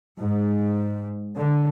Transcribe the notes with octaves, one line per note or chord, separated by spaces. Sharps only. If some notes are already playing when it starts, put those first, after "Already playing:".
G#2
D3